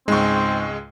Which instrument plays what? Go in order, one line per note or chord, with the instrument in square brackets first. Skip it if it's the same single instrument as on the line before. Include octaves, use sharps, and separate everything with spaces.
[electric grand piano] C#2 G#3 [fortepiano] G#2 C#6 [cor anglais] C4